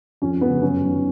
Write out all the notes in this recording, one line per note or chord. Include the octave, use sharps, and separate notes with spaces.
F2 C#4
C#3 F3 B3
F#2 C#4
D#3 F#3